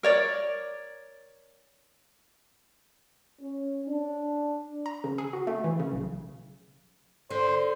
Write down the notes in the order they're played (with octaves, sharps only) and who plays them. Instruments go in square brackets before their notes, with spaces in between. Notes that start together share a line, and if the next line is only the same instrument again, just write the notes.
[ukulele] A#4 C#5 D5
[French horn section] C#4
D4
[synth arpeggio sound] A#5
C#3
G#4
F#4
A3
E3
C#3
B1
[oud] D3 [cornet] C5